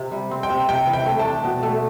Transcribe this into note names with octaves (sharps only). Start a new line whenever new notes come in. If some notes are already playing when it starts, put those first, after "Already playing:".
Already playing: C3
G3
C4
G5
C3
C3 G5
E3
G5
A3
A5
D4
B2
A3